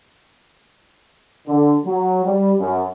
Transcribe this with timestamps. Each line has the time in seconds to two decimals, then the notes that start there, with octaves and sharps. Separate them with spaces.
1.47 D3
1.85 F#3
2.25 G3
2.60 F#2